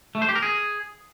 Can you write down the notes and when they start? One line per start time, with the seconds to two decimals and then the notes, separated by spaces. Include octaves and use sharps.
0.15 A3
0.22 C5
0.29 G4
0.35 A#4
0.42 G#4